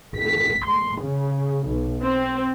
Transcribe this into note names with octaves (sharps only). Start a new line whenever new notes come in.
B6
C6
C#3
B1
C4